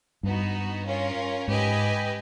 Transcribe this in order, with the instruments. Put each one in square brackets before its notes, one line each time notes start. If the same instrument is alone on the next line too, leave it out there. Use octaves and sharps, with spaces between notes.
[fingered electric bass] G2 [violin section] B3 D#4 F#4
[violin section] C#4 F4 A#4 C#5
[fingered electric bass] G#2 [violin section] G4 B4 D#5 G#5